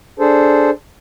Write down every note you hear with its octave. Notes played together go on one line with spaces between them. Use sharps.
D4 G#4 A4 C5